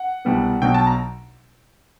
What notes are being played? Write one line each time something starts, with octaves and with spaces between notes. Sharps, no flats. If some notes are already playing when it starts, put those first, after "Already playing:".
Already playing: F#5
C2 B2 G3 B3
B1 B2 F#3 G5
A5
A#5